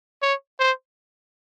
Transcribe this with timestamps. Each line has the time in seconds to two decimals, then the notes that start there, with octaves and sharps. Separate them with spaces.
0.22 C#5
0.60 C5